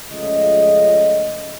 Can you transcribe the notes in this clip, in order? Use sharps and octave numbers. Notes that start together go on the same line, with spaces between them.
C#2 C#3 F3 A3 D#5